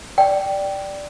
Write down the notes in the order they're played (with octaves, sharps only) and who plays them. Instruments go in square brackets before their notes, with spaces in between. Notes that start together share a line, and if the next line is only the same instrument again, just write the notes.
[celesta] D5 [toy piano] G5